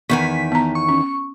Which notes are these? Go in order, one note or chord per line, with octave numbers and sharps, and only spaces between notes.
E2 D#3 G#5 C#6 B6
B3 A#5
C#6
C#4